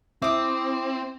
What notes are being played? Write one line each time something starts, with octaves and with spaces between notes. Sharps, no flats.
C4 E4 E5 D6 D#6